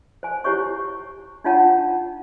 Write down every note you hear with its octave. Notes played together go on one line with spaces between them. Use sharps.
C5 G#5
E4 G4 C5 C#5 C#6
D4 D#4 F4 C#5 F#5 A5